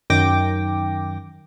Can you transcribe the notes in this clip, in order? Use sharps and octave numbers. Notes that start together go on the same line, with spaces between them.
F#2 D#3 G5 D6 A#6